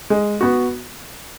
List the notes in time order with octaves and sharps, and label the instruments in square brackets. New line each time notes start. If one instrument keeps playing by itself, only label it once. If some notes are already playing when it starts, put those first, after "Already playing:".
[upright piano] G#3
B3 F#4